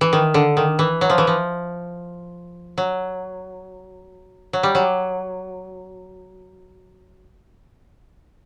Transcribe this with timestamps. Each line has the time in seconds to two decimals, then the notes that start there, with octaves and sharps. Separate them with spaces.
0.01 E3
0.13 D#3
0.34 D3
0.57 D#3
0.79 E3
1.01 F#3
1.10 F3
1.18 E3
1.27 F3
2.78 F#3
4.53 F#3
4.63 G3
4.75 F#3